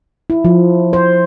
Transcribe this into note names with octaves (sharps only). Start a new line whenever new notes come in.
E4
F3
C5